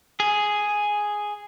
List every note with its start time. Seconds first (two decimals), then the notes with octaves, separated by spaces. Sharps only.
0.20 G#4